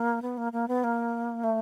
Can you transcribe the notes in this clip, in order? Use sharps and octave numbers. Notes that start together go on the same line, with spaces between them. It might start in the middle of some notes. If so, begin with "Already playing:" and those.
Already playing: A#3
B3
A#3
A#3
B3
A#3
A3